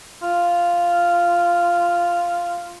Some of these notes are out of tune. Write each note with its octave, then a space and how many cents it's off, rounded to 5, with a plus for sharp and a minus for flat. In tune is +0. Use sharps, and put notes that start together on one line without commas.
F4 -5